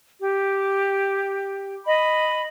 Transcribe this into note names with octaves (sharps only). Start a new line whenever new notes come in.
G4
D#5 B5